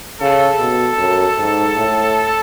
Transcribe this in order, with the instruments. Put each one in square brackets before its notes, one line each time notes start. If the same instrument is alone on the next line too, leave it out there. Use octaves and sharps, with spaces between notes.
[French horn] C#3 [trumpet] A4
[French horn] B2
F#2
G#2
A2